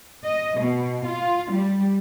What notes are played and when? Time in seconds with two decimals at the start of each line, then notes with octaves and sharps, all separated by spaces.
0.23 D#5
0.59 B2
1.05 F4
1.52 G3